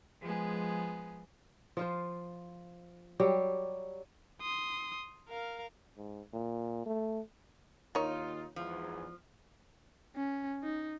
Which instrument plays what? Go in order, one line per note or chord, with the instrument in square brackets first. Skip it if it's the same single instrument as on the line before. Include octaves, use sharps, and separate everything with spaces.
[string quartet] F3 G#3 B3 G#4
[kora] F3 F4 C5
F#3 G3 G4
[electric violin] C6 D#6
A#4 F5
[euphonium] G#2
A#2
A3
[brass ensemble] D#2 F4 [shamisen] D#3 C#5 [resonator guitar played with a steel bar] D#4
[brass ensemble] E2 G#2 [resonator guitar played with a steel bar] F3
[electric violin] C#4
D#4